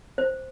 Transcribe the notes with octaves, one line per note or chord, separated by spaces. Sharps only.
C5